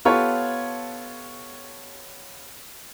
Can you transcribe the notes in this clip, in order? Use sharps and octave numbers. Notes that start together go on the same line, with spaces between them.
B3 F4 G4 A4 C#5 A5